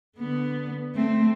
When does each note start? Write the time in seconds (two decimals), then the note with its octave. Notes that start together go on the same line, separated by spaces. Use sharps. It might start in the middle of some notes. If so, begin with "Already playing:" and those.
0.17 D3 B3
0.95 A3 C4